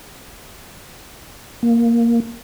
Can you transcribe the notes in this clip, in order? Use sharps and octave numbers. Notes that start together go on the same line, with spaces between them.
A#3